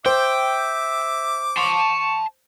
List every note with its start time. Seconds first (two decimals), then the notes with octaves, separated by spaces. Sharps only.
0.06 C5 E5 G5 D6
1.57 A5 C6 C#6